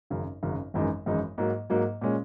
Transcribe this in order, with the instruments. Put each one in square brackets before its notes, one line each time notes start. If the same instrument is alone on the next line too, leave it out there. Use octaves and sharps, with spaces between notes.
[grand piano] G#1 F#2 C#3
G#1 F#2 C#3
G#1 F#2 E3 G#3 D#4
G#1 F#2 E3 G#3 D#4
G#2 F#3 A#3
G#2 F#3 A#3
A#2 G#3 C#4